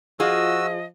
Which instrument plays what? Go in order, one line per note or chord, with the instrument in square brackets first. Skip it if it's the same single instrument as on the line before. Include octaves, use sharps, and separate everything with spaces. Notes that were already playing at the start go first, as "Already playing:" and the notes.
[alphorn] F3 [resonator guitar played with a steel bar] F4 G#4 [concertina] F#4 E6 [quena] D#5